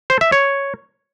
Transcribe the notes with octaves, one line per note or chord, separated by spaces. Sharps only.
C5
E5
C#5